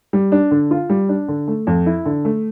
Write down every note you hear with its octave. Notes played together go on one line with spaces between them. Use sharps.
G3
D4
D3
F4
G3
D4
D3
A3
F2
E4
D3
A3